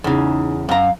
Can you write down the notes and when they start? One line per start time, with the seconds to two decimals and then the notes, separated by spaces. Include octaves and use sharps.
0.04 E2 C#3 D#4
0.69 F#2 F5 A#5